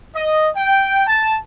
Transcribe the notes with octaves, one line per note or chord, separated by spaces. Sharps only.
D#5
G5
A5